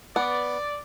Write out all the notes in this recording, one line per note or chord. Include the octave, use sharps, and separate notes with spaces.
B3 D5